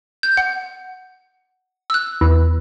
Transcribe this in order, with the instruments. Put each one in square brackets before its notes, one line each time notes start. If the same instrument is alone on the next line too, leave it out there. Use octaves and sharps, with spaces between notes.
[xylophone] G6
F#5
E6 F#6
[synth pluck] E2